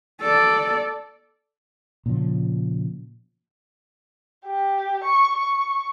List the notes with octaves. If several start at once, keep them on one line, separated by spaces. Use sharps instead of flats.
A4 D5
A#2 C#3 F3
G4
C#6
C#6